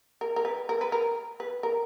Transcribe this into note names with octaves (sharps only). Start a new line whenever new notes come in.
A#4
A#4
B4
A#4
B4
A#4
B4
A#4